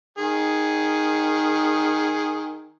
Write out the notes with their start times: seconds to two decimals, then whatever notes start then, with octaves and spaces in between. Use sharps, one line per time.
0.18 D#3 G#4